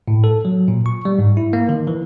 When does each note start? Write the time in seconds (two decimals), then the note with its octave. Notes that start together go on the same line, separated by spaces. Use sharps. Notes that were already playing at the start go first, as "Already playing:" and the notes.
0.08 A2
0.24 A4
0.45 F#3
0.68 A#2
0.86 C#6
1.05 G3
1.19 G#2
1.37 E4
1.53 A#3
1.69 D#3
1.87 E3